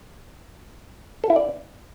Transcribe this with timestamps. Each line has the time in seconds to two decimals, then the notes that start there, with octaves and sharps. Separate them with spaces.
1.24 A4
1.30 E4
1.36 D5